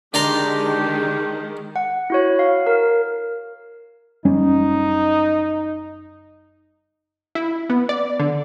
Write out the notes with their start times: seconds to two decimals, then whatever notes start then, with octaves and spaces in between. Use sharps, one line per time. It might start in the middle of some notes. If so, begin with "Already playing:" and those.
0.14 D3 D#3 G#3 D4 G4 D5 A#5 C6
1.76 F#5
2.10 E4 F#4 C#5
2.39 F5
2.67 A#4
4.25 F#1 G3 C#4 D#4
7.35 E4
7.70 B3
7.89 D5
8.20 D3